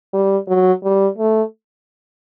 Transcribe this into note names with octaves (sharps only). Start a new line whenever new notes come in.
G3
F#3
G3
A3